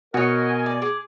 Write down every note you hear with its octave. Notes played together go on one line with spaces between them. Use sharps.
B2 F#4 A#4 C#5 D#5 G#5
D5
G#4 D6